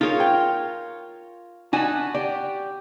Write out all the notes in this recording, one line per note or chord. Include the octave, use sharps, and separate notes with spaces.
D#4 F4 G#4 A#4 C#5
G5
D4 D#4 F#4 G#5 A5 B5
G4 D5